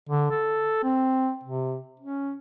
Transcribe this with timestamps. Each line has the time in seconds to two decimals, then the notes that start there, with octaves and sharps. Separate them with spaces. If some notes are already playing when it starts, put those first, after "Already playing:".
0.09 D3
0.31 A4
0.83 C4
1.44 C3
2.00 C#4